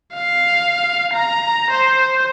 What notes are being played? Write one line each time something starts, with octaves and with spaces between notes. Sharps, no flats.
F5
A#5
C5